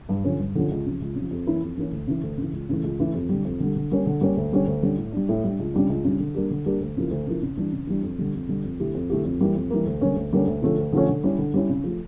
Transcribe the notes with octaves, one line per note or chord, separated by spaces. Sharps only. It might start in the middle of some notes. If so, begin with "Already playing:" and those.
G2
D3 F3 C#4
G2
D3 F3 C#4
C#2
C#3 F3
C#2
C#3 F3
F2
E3 A#3 C#4 E4
F2
E3 A#3 C#4 E4
D2
C#3 E3
D2
C#3 E3
C#2
C#3 E3 A3
C#2
C#3 E3 A3
F2
D3 G3
F2
D3 G3
D3
G3 A#3 C#4
D3
G3 A#3 C#4
D2
D3 G3 C#4
D2
D3 G3 C#4
A2
G3 D4
A2
G3 D4
C#2
C#3 G3 D4
C#2
C#3 G3 D4
D3
G3 A#3 D4 G4
D3
G3 A#3 D4 G4
D2
C#3 F3 A#3 E4
D2
C#3 F3 A#3 E4
C#3
E3 G3 D4
C#3
E3 G3 D4
F2
D3 G3
F2
D3 G3
F2
D3 A3 E4 G4
F2
D3 A3 E4 G4
F2
E3 G3 A#3
F2
E3 G3 A#3
D2
D3 G3 A#3 C#4
D2
D3 G3 A#3 C#4
D2
D3 F3 A3 C#4
D2
D3 F3 A3 C#4
D3
G3 C#4 E4
D3
G3 C#4 E4
C#3
F3 A3